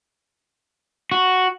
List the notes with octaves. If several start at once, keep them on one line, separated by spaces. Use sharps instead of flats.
F#4